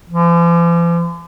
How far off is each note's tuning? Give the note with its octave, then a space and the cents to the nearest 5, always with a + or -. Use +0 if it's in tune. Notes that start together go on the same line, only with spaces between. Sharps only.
F3 -45